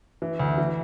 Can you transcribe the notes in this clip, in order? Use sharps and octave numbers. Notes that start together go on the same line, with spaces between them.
E3
D2
E3